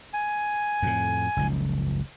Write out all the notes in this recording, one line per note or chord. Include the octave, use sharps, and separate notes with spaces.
G#5
F2 A2
F#1 C#2 F3